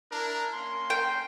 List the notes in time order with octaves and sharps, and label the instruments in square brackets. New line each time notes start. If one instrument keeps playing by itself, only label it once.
[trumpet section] D4 E4 A#4
A#3 C#4 C6
[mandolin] G5